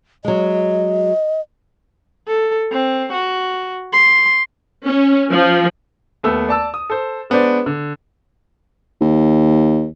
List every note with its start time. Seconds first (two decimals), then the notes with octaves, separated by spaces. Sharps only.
0.25 F#3 G#3 D#5
2.28 A4
2.72 C4
3.13 F#4
3.93 C6
4.86 C#4
5.30 F3
6.23 D#2 A3 B3 E6
6.49 D5 A5 E6
6.74 D#6
6.90 A4 C5
7.30 G#3 B3 D4 C5 D5
7.66 D3
9.01 D#2